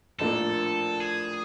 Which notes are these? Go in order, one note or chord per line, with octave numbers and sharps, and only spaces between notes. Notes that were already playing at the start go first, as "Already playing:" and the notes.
A#1 A2 F3 A#3 D4 A4
G#4